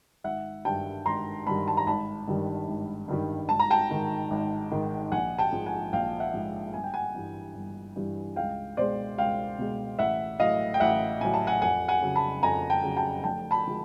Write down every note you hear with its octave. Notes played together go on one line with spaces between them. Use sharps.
G#1 E5 F#5
G2 D#3 G3 G5 A5
G#1 A#5 C6
G2 D#3 G3 A5 B5
A5
A#5
G#1 A5 B5
G2 D#3 G3
G#1
G2 D#3 G3
G#1 A5
A#5
G5 A5
G#2 D#3
G#1
G#2 D#3
A#1 F#5 G#5
G5 A5
G#2 F3 G#3
F#5 G#5
A#1 F5 G5
E5 F#5
G#2 F3 G#3
G1 G#5
G5
F#5 G#5
G2 E3 G3
G1
G2 E3 G3
C#2 F5 G5
B2 G#3 C5 D5
C#2 F5 G5
B2 G#3
A1 E5 F#5
A2 F#3 D#5 F5
G5
A1 E5 F#5
A2 F#3 G#5
A5
F#5 G#5
F2 F#5 G#5
F#5 G#5
C#3 F#3
A5 B5
F2 G#5 A#5
G5 A5
C#3 F#3
G5 A5
F1 G5 A5
A5 B5
D3 F3 G#3